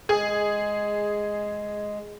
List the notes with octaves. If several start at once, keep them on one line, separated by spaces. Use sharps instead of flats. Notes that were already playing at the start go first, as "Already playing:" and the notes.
G#3 G#4